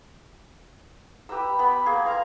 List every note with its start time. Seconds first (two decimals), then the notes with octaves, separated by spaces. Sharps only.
1.29 G4 B4 A#5 E6
1.59 B3 B5
1.86 A#3 G#4
2.06 F5 A#5 C6